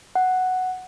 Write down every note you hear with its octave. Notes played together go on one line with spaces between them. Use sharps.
F#5